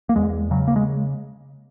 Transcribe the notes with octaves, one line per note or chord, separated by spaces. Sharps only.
A#3
E2 G#3
C#3 F#3
A#3
G#3